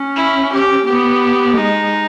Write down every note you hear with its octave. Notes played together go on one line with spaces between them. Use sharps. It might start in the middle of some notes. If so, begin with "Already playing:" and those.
Already playing: C#4
E4
G4
B3 G4
G#3 D#4